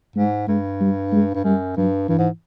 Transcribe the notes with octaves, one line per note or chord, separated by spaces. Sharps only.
G#2 G#3
G2 G#3
G3
G#3
G2
F#2 G3
G2 F#3
G2 E3
G#2